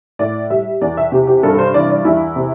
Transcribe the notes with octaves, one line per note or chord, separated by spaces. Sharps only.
A2 D5
G3 E5
E2 D5
E5
C3 G4
G4
G2 A4
C5
E3 D5
D5
E2 E4
C3